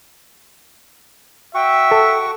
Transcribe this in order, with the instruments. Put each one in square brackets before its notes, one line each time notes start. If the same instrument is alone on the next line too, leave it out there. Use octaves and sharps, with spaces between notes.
[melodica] F#4 C#6 [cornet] E5 [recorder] G5
[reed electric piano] A4